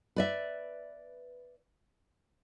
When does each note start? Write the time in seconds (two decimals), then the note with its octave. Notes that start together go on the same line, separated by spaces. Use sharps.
0.16 B4 D5 E5